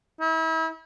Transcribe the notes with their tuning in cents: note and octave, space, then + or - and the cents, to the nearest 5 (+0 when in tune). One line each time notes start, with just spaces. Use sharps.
E4 -35